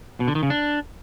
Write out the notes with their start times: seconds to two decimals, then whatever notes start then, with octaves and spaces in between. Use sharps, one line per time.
0.20 B2
0.28 D3
0.35 D#3
0.43 C#3
0.50 D4